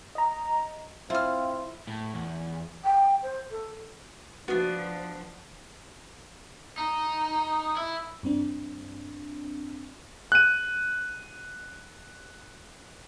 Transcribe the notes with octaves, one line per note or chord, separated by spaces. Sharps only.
D#5 A#5
C4 E4 F4 F5 F6
A2
E2
G5
C5
A4
F3 B3 D4 F#4
D#4
E4
G2 C4 D4
F#6 D#7